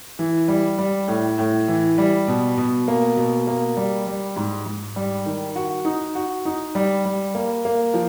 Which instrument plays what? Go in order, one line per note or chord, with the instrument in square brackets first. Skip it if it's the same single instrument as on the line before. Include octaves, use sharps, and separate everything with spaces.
[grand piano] E3
G3
G3
A2
A2
E3
G3
B2
B2
A#3
B2
A#3
G3
G3
G#2
G#2
G3
D#3
F#4
D#4
F#4
D#4
G3
G3
A#3
A#3
F3